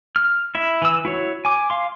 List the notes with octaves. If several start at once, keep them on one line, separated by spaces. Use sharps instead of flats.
F6
E4 E5
E3 E6
E4 F#4 C#5
G#5 D6
F5 C6